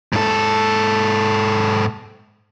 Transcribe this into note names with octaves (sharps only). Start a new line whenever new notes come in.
G#2 A4